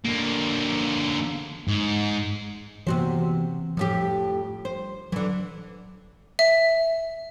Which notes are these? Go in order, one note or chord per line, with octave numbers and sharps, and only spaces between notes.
D3 A#3
G#2
C3 E3 A#3 B3 F#4 C5
F2 A2 F3 G4
C5
D3 E3 F#3
E5